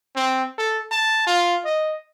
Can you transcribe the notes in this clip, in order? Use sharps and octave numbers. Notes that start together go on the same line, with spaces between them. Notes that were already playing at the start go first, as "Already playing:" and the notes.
C4
A4
A5
F4
D#5